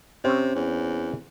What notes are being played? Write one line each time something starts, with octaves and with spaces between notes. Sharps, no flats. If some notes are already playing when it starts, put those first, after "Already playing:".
C3 C4 C#4
E2